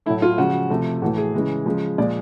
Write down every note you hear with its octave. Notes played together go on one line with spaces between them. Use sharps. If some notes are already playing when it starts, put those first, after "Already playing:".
A2 F#3 A3 E4
F4
C#3 F3 G#3 F#4
C3 F3 A3
A2 E3 A3 F#4
G#4
C#3 E3 G#3
C#3 F3 G#3
A#2 F3 G#3 D5